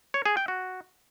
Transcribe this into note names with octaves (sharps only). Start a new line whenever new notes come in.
C#5
G#4
G5
F#4